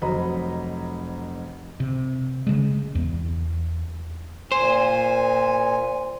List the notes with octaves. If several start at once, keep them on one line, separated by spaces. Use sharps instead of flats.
F1 F#3 C5 D#5 A#5 B5
C3
C#3 G#3
E2
A#2 C5 G#5